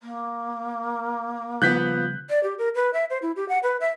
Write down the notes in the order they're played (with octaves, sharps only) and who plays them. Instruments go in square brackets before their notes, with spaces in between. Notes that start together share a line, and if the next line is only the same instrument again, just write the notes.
[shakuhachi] A#3
[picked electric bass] C#3 G3 [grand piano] F3 B3 [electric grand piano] F#6 G6 B6
[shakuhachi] D5
G4
A#4
B4
E5
C5
E4
G4
F#5
B4
E5